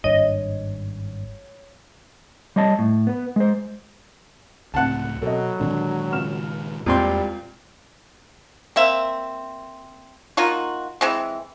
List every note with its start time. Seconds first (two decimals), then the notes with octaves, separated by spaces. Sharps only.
0.04 G#1 G2 C#5 D#5
2.56 G3 C#5 D#5 A5
2.79 A2
3.07 B3 B4
3.36 G#3 C5
4.74 C#2 A2 C3 F#5 A5 F#6
5.22 B2 F#3 A4 D#5
5.60 A#2 D3 D#3 G#3
6.12 C#2 F6 E7
6.86 E2 A#2 G3 G#3 C4 C6
8.76 A#3 C4 E5
10.37 A#3 D#4 F4 F#4
11.01 E3 G#3 C4